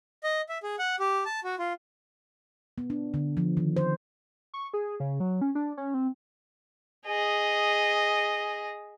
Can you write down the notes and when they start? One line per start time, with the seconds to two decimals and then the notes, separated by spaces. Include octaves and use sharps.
0.24 D#5
0.49 E5
0.63 G#4
0.79 F#5
1.00 G4
1.25 A5
1.44 F#4
1.59 F4
2.78 B3
2.90 D4
3.14 D3
3.37 F3
3.57 D#3
3.77 C5
4.54 C#6
4.74 G#4
5.00 C#3
5.20 F#3
5.41 C#4
5.55 D4
5.77 C#4
5.94 C4
7.06 G#4 D#5